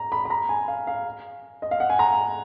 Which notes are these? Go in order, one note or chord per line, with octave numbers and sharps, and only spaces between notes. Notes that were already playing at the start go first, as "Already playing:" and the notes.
Already playing: A#5
B5
B5
A#5
G#5
F5
F5
D#5
F5
F#5
G#5
A#5